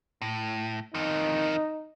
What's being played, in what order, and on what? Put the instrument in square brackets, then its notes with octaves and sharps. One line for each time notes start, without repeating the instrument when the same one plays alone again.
[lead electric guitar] A2
[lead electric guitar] F2 D#3 [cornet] D#4